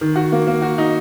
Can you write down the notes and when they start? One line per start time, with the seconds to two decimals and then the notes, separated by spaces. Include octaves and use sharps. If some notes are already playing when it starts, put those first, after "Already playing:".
0.01 D#3
0.16 F#4
0.32 A#3
0.47 A#3
0.62 F#4
0.78 D#4